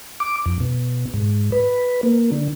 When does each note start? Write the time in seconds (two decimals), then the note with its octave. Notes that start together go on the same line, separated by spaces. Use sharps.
0.20 D6
0.46 F2
0.60 B2
1.14 G#2
1.52 B4
2.03 A#3
2.32 D3